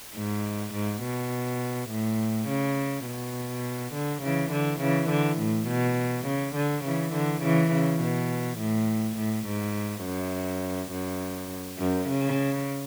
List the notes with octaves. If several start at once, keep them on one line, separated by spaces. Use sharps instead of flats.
G#2
G#2
B2
A2
C#3
B2
D3
C#3 E3
D3
C#3 E3
D3
A2
B2
C#3
D3
C#3 E3
D3
C#3 E3
C#3
B2
A2
A2
G#2
F#2
F#2
F#2
C#3